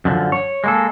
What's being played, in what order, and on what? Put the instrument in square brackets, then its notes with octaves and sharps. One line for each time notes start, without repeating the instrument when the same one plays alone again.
[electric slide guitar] F#2 D3 F3
C#5
G#3 A#3 A4